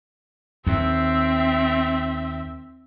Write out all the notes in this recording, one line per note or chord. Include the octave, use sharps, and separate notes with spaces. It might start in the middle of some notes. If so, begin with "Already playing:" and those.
D#2 C4 E5